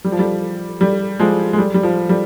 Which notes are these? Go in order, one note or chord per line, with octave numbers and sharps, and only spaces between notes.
G3
F3
G3
G3
F3 G#3
G#3
G3
G3
F3
G3